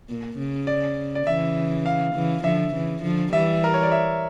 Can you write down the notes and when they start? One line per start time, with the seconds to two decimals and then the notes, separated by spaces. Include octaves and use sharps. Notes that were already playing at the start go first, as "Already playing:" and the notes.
0.09 A#2
0.38 C#3
0.67 D5
1.15 D5
1.27 C#3 E3 E5
1.86 F5
2.15 C#3 E3
2.44 D3 F3 E5
2.74 C#3 E3
3.03 D3 F3
3.33 E3 G3 E5
3.64 A#4
3.74 C#5
3.83 D5
3.92 E5